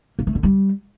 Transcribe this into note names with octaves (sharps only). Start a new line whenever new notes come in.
A#3
A3
D3
G3